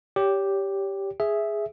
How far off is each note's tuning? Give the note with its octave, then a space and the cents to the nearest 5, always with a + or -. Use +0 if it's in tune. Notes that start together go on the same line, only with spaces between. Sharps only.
G4 +0 C#5 +30
G#4 +0 E5 +0